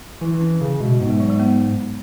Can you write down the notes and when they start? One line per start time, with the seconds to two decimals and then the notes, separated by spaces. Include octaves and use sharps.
0.21 E3 E4
0.34 E4
0.41 C#4
0.61 C#3 C#4
0.80 B2 G#3
1.00 G#2 B3
1.10 G#3
1.20 F#3
1.30 G#3
1.40 B3